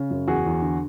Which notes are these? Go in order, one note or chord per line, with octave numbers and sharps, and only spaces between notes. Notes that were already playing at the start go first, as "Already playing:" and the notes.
Already playing: C#3
F#2
E2 F#4 G#4
E2
D3